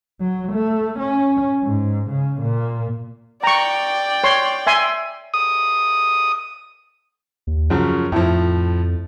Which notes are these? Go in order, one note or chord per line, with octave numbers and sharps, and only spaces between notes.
F#3
A3
C#4
G#2
C#3
A#2
D5 G5 A#5 C#6
C#5 C6
E5 G#5 C6
D#6
D#2
F#2 C#3 F3 F#3
F2 A2 F3